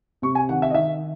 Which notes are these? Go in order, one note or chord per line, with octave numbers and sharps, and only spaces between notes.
C3 C#6
G#5
D#3 F#5
E5
D#5
D#3 E5